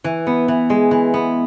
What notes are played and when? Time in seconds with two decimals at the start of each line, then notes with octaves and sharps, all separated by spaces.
0.04 E3
0.27 B3
0.48 E3
0.70 G#3
0.91 E3
1.14 B3